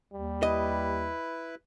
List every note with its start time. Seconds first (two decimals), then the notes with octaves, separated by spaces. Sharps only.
0.13 D#2 G3
0.43 E4 B4 D#5